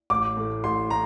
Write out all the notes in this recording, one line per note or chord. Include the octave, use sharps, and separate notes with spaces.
A1 D6
A2 A3
A1 C6
A2 A#5